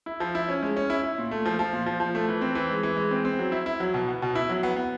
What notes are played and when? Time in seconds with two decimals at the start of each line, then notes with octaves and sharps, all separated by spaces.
0.06 E4
0.20 F3
0.35 E4
0.48 C#4
0.63 G#3
0.77 C#4
0.90 E4
1.03 E4
1.18 A#2
1.31 A3
1.45 F3
1.59 F3
1.73 A#2
1.86 F3
2.00 F3
2.15 A3
2.29 E3
2.41 C4
2.55 E3
2.70 G#3
2.83 E3
2.97 G#3
3.11 C4
3.25 C4
3.39 F#3
3.52 E4
3.66 E4
3.80 F#3
3.94 B2
4.08 B3
4.22 B2
4.35 E4
4.49 F#3
4.63 B3
4.76 B3